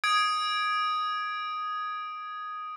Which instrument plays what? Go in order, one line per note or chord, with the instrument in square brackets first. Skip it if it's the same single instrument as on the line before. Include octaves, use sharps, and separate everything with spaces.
[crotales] D#6 G#6 D7